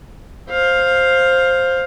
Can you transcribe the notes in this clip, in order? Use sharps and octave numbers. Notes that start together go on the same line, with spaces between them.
C5 F5